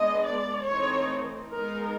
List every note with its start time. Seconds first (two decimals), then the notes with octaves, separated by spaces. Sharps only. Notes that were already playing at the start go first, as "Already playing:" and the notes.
Already playing: G#3 B3 D4 D#5
0.26 D5
0.66 E3 A3 C4 D#4 C#5
1.50 G#3 B3 D#4 A#4